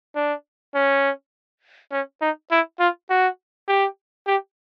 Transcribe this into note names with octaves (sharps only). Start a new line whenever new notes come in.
D4
C#4
C#4
D#4
E4
F4
F#4
G4
G4